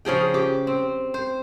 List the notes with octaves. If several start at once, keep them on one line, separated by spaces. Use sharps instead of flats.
C#3 F3 G#4 G5
G4
C4
C5